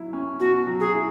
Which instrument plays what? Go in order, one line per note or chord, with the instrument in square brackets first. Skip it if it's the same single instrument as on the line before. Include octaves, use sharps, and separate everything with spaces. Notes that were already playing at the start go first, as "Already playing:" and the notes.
Already playing: [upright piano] F#3 E4
C#4
[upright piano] B2 [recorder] F#4
[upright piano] F#3
[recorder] G#4
[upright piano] E4